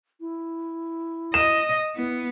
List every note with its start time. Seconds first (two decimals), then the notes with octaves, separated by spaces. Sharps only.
0.21 E4
1.34 D#5 E7
1.96 B3 E4